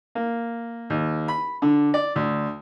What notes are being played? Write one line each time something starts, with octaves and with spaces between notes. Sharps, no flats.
A#3
D#2
B5
D3
D5
D2